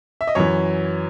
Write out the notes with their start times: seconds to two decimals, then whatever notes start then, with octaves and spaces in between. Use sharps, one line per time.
0.21 E5
0.27 D#5
0.35 F#2 E3 C#5